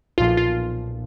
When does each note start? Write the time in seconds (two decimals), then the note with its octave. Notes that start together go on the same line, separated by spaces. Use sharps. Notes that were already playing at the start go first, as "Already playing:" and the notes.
0.18 B1 A#2 F3 F4
0.37 F4